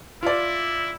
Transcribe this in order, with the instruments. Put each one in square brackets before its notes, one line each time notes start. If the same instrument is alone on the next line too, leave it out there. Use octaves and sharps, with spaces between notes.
[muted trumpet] E4 [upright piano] F4 D5